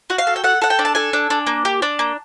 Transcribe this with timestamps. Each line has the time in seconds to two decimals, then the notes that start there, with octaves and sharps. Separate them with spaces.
0.10 F#4 F#5
0.18 F5
0.27 A4
0.36 G5
0.44 A4 F#5
0.62 A4 F#5
0.70 G5
0.79 D4
0.85 A5
0.95 A4 G#5
1.13 D4
1.30 D4
1.47 A#3
1.65 G4
1.82 D4
1.99 A#3